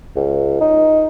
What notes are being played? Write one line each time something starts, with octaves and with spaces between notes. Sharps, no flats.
C#2
D#4